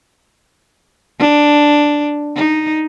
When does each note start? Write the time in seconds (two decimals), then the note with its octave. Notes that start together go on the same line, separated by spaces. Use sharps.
1.19 D4
2.36 D#4